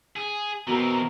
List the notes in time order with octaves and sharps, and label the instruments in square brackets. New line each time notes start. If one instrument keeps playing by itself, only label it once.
[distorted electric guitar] G#4
[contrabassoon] B2 [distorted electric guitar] E3 C4 [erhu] A#4